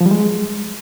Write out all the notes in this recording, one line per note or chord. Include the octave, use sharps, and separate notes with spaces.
F3
G3
G#3